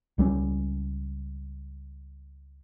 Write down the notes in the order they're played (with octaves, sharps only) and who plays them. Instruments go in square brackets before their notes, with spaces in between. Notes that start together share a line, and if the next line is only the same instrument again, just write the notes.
[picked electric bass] C#2 G3 C4 C#4